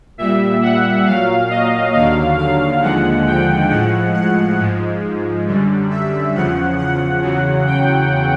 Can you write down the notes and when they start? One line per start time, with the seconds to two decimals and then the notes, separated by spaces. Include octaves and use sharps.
0.18 A#2 G3 E5
0.62 F#5
1.06 A#2 F#3 F5
1.50 D#5
1.94 D#2 D3 F#3 F5
2.38 F5
2.82 D#2 D3 F3 G#3 F#5
3.27 G5
3.70 A2 F3 G#3 F#5
4.14 F#5
4.58 G#2 F3 G#3
5.46 F#2 D3 G3
5.90 E5
6.34 E2 C#3 F3 F#5
6.78 F#5
7.22 E2 C#3 F#3
7.66 G5